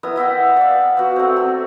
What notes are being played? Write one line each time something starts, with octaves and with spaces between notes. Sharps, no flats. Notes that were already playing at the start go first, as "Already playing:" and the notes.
B3 E4 A#4 D#6
D#5 E5 F#5 G5
D5 F5
B3 F#4
A3 C4
A3